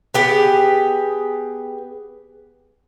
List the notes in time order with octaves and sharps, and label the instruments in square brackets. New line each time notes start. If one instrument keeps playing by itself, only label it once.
[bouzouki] B3 G4 G#4